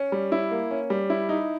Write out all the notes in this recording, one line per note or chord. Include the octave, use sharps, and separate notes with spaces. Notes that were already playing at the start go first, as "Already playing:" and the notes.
Already playing: C#4
G3
E4
A#3
C#4
G3
E4
D#4